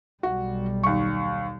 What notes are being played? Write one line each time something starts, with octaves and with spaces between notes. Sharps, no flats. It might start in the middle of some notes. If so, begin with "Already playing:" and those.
B1 G3 F#4
D#2 C#6